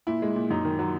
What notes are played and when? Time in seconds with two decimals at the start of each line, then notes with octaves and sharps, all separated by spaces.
0.07 A#2 E4
0.22 G#3
0.36 A#2
0.50 F#2 D#4
0.65 D#3
0.79 F#3